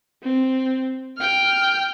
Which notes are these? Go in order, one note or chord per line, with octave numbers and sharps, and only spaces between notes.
C4
G5 F6